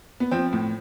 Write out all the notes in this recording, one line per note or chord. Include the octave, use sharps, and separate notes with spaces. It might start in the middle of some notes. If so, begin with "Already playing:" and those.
B3
F3 C4
A2